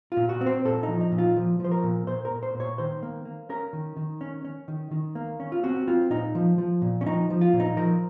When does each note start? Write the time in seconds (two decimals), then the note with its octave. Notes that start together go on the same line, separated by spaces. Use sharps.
0.12 A#2 F4
0.29 F#4
0.41 C4
0.46 C5
0.65 A#2 A4
0.83 D#4
0.88 F3
1.01 D#4
1.12 A#2
1.18 F4
1.37 F3
1.60 F3 C5
1.71 A#4
1.83 A#2
2.07 A#2 C5
2.25 A#4
2.30 A#2
2.43 C5
2.55 A#2
2.60 C#5
2.78 D#3 C5
3.03 A#3
3.25 A#3
3.49 C#4 A#4
3.73 D#3
3.97 D#3
4.21 C#4
4.45 C#4
4.68 D#3
4.91 D#3
5.15 A#3
5.40 C#4
5.52 F4
5.64 C4 F#4
5.88 C4 F4
6.10 A#2 D#4
6.35 F3
6.58 F3
6.82 A#2
7.01 C#4
7.06 F3 D#4
7.30 F3
7.41 F4
7.53 A#2
7.60 D#4
7.77 F3 A#4